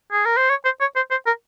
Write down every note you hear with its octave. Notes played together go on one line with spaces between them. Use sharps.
G#4
A#4
C5
C#5
C5
C#5
C5
C5
A#4